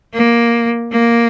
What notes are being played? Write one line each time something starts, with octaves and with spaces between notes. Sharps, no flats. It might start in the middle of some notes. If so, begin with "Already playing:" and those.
A#3
A#3